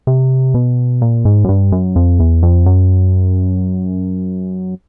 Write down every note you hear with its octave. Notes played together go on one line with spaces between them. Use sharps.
C3
B2
A#2
G#2
F#2
G2
F#2
F2
E2
F2
F#2